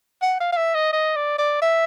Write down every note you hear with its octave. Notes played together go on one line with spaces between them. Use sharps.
F#5
F5
F5
E5
D#5
D#5
D5
D5
E5